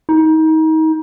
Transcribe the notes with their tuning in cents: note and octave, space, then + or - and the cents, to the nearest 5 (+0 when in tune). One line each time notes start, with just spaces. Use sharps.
D#4 +30